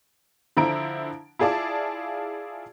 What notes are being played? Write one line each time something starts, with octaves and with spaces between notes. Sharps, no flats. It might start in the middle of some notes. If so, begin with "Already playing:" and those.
D3 F3 E4 A#5 D7
E4 F4 G#4 D5 A5 D6